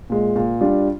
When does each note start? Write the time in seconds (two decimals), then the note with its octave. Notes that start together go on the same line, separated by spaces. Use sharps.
0.10 A#2 G#3
0.36 A#2
0.61 G3 D4 F4